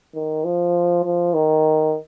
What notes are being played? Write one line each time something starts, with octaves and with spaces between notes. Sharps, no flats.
D#3
F3
F3
D#3